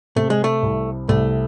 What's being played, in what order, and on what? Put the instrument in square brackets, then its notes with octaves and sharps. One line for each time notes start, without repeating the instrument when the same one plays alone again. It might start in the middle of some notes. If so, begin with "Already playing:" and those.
[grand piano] C3 [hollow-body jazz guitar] A3
[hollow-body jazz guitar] G#3
A3
[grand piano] C2
[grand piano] C2 [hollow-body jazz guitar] A3